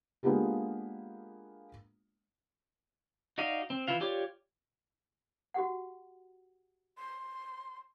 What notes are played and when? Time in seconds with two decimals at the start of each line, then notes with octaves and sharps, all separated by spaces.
0.23 G#3 A#3 B3 D4 F4 G4
3.38 D#4 F#4 D5 D#5 F5
3.70 C4
3.88 E3 E4 F4 F5
4.01 F4 G4 C#5 D5 D6
5.54 F#4 G4 F#5
6.98 C6